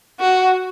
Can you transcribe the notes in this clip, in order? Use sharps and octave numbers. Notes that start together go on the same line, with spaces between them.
F#4